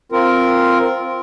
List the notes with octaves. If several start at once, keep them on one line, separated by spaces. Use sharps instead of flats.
C4 F4 A#4